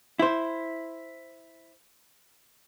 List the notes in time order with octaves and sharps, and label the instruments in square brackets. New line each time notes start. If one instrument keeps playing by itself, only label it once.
[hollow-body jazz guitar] E4 C5